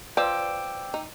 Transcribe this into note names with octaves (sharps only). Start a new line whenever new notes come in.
F3 B4 D5 G5 D6 E6
D#4